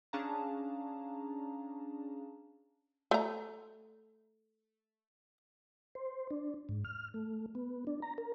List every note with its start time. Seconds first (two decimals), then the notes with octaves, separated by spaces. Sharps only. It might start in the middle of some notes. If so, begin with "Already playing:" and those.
0.13 C#4 D4 G#4 F5 A5 A#5
3.11 A3 A#5
5.95 C5
6.31 D4
6.69 G#2
6.85 F6
7.14 A3
7.55 B3
7.87 D4
8.02 A#5
8.18 A#4